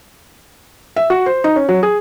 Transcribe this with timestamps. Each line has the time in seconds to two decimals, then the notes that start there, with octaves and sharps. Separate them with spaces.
0.96 E5
1.10 F#4
1.26 C5
1.44 D#4
1.56 C#4
1.69 F#3
1.83 G#4